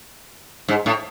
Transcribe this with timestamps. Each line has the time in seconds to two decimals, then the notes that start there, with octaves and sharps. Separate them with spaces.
0.68 G#2
0.86 A2